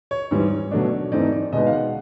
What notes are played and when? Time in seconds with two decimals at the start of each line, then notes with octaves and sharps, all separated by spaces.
0.11 C#5
0.31 G#2 E3 G3
0.71 B2 F#3 A3 D4
1.12 G#2 E3 A3 C4 D#4 D5
1.32 D5
1.53 B2 G#3 B3 D#4 D#5
1.67 F5
1.73 F#5